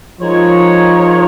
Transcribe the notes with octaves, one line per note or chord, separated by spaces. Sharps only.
F3 G#3 D#4 A#4 C#5